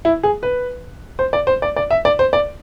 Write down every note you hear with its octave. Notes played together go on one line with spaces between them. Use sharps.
E4
G#4
B4
C5
D5
C5
D5
D5
E5
D5
C5
D5